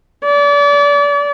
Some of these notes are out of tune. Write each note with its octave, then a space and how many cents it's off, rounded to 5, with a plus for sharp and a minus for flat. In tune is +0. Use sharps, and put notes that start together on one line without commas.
D5 -35